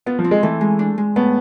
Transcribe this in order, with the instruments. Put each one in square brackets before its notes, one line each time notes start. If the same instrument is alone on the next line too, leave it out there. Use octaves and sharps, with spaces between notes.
[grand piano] B3 [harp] F4
[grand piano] F3
[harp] C4
[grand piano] G#3
[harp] E3 [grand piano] A3
[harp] G#3
D4
G#3
[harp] A2 [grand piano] B3